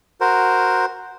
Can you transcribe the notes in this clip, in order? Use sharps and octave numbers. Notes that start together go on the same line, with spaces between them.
F#4 A#4 C5